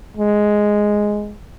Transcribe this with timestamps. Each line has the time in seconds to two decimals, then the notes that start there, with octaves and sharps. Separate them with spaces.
0.17 G#3